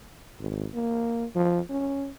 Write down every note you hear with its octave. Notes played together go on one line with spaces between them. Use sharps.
G#1
A#3
F3
C#4